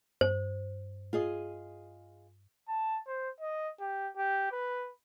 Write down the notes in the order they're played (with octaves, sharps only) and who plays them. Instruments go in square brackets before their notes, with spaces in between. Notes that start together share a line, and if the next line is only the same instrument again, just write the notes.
[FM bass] G2 [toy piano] C5
[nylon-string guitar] F4 G#4 D#5
[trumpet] A5
C5
D#5
G4
G4
B4